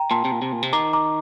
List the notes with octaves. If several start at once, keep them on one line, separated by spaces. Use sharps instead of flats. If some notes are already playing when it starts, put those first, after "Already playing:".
Already playing: G5 A#5
A#2 A5 C6
C3
A#2
C3
A#2
C3
D#3 A#5 D6
A#5 D6